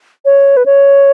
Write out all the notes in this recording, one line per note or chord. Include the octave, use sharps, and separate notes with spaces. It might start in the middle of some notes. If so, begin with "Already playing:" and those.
C#5
B4
C#5